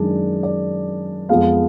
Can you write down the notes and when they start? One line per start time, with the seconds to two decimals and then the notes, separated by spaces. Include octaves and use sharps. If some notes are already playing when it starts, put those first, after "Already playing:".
Already playing: F#2 D#3 G#3 D4 D5
0.43 D5
1.29 F2 F3 G#3 B3 F5